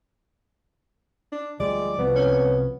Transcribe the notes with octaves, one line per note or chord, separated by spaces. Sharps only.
D4
D2 F3 G3 G#3 D5
C2 C3 F3 B3
C#4